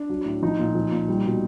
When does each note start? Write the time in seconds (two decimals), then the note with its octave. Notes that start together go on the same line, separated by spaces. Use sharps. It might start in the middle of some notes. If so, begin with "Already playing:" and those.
Already playing: D4
0.10 F#3
0.25 A2
0.42 F3 D#4
0.59 A#2
0.75 F3
0.92 A#2
1.08 G3
1.25 B2